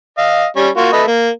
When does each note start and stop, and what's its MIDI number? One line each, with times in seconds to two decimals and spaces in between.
0.18 0.46 75
0.18 0.46 77
0.56 0.69 55
0.56 0.69 61
0.77 0.90 58
0.77 0.90 65
0.77 0.90 66
0.93 1.03 57
0.93 1.03 71
0.93 1.03 75
1.07 1.29 58